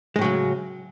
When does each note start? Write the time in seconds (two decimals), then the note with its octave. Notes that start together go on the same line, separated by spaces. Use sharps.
0.16 G#3
0.19 A2
0.21 F#3
0.24 C#3